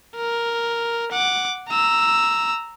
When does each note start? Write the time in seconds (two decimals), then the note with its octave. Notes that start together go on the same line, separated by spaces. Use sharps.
0.17 A#4
1.12 F#5 D6
1.69 A#5 E6